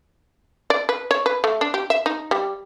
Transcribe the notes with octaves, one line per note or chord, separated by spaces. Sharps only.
D5
B4
C#5
B4
A3
D4
G4
E5
D#4
G3